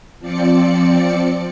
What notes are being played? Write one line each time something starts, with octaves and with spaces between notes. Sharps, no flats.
F3 C4 D5 C#7